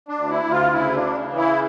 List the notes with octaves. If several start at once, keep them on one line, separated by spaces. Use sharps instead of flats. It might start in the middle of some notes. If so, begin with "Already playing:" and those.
D4
D2
E4
D2
F4
C#3 E4
D4
C#3
E3
E4